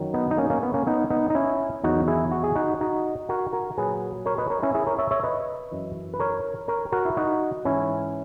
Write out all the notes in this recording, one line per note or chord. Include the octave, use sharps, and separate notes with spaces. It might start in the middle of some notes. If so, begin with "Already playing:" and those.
Already playing: F#2 D#3 F#3
B3 D#4
D#4
A#3 C#4
A#3 C#4
B3
A#3 C#4
B3 D#4
B3 D#4
D#4
C#4 E4
E2 D#3 F#3 D#4 F#4
E4 G#4
F#4
G#4
D#4 F#4
D#4 F#4
F#4 A#4
F#4 A#4
A#2 F#3 G#4 B4
A#4 C#5
B4 D#5
A#4 C#5
C#4 E4
E4 G#4
A#4 C#5
C#5 E5
C#5 E5
B4 D#5
F#2 E3
B4
A#4 C#5
A#4 C#5
F#4 A#4
E4
D#4 F#4
G#2 E3 C#4 E4